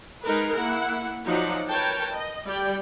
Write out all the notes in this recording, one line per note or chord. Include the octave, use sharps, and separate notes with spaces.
G#3 D#4 G#4 A#4 B4
A#3 E4 F#5
F3 F#3 D#4 D5 F#5
A#4 B4 C#5 G5 A5
D#5
G3 G4 D5 G5